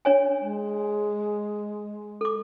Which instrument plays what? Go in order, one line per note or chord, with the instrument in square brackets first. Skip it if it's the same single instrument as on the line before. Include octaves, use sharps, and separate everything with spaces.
[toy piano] D4 C#5 G#5
[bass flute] G#3
[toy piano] A4 D6